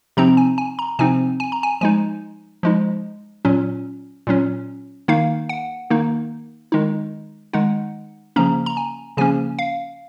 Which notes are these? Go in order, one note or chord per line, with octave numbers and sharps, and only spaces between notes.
C3 F3 C4 D#4 A#5
G#5
G#5
A#5
C3 F3 C4 D#4 G#5
G#5
A#5
G#5
F3 G#3 D#4 G#5
F3 G#3 D#4
A#2 F#3 C#4
A#2 F#3 C#4
D#3 A#3 D#4 F5
F#5
D#3 A#3 D#4
D#3 G#3 D#4
D#3 G#3 D#4 F#5
C#3 F3 A#3 C#4 A#5
A#5
G#5
C#3 F3 A#3 C#4 G#5
F5